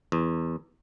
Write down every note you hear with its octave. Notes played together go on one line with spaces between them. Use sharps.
E2